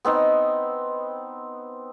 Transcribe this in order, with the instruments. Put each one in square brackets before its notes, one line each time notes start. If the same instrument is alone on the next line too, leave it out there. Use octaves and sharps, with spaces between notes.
[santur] B3 C4 D#4